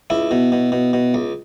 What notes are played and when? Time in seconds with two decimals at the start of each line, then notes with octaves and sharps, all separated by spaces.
0.10 C#2 E4
0.31 B2
0.52 B2
0.72 B2
0.93 B2
1.14 C#2